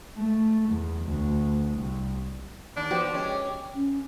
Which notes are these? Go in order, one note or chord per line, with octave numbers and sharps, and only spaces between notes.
A3
E2
D2
C2
D#2 D4
F3 F#4 G4 B4 G5 D6
G#3 C#4 D5
C#4